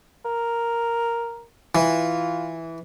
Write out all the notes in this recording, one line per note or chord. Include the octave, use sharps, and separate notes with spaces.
A#4
E3 F4